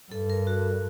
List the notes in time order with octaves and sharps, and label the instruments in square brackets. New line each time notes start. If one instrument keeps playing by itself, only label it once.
[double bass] G2 [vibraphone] A4
[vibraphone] A#4
F#4